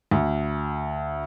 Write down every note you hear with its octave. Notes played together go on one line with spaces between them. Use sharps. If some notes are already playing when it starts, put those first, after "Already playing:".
D2